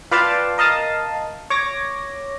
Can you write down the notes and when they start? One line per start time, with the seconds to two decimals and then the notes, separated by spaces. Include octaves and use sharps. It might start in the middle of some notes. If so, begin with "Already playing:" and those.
0.11 F4 B4 D5 F5 G5 A5
0.58 A#4 D#5 F5 A5 D#6
1.50 C#5 D6 A#6